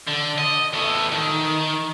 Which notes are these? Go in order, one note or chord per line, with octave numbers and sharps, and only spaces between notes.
D3
D#5
E2 A3
D#3